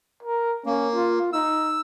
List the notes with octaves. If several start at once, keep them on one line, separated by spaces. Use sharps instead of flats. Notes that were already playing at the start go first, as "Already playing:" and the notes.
A#4
A#3 C#4
F4
D#4 E6